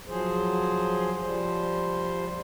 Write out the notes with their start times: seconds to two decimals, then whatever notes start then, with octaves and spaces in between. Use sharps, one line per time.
0.08 F3 F#3 G#4 C5
1.21 F3 G3 C5